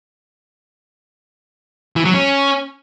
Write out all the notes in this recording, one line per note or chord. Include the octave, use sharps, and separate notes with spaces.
E3
F#3
C#4